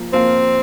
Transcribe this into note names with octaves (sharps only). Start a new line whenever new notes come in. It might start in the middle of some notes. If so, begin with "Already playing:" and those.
Already playing: F3 A#3
F3 A#3 C4 F4 A#4